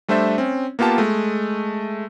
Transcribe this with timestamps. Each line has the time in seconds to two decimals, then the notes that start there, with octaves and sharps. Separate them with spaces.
0.08 G3 A3 D4 C5 E5
0.38 C4 C#4
0.79 A#3 B3 F4 G4 A5
0.98 G#3 A3